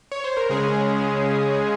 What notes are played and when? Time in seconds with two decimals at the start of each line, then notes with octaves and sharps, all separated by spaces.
0.12 C#5
0.24 C5
0.37 A#4
0.50 C#3 G#3 C#4 G#4